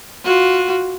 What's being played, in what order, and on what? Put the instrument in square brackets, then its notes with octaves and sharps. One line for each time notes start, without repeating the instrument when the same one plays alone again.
[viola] F4 F#4